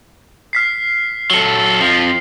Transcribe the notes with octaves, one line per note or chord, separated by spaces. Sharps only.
F6 B6 C7
F#3 A4
F2 F3 C7